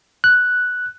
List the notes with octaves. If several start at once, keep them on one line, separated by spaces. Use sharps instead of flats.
F#6